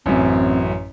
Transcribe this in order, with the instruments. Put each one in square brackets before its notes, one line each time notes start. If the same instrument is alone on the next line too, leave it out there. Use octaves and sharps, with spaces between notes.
[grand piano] A1 F#2 [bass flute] C4